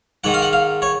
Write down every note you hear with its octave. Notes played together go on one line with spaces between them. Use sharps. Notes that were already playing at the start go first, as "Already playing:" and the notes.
G#2 D#3 F#5
F5
F#5
F5
C#5